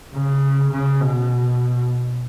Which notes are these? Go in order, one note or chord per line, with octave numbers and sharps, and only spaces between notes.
C#3
C#3
B2